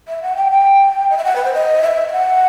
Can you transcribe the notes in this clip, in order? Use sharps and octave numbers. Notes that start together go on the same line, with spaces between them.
E5
F#5
G5
G5
D#5
E5
F#5
B4
C5
D#5
E5
E5
F#5